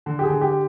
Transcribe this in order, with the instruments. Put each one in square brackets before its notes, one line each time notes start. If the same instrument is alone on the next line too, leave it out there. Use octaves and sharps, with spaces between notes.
[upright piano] D3
[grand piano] G4
G#4
[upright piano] D3
[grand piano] G4